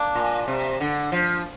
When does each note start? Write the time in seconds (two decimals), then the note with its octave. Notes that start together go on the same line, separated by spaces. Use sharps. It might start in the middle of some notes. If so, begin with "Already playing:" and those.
Already playing: A#3 D4
0.15 A#2
0.48 C3
0.80 D3
1.12 F3